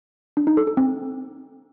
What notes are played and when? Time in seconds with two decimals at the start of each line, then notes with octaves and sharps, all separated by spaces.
0.37 D4
0.47 D#4
0.57 A4
0.67 A4
0.77 C4